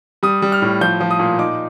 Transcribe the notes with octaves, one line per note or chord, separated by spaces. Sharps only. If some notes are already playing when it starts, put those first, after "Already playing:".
G3 D#6
G3
F6
A2
F3 G6
F3
D#6
A#2
D#4 D6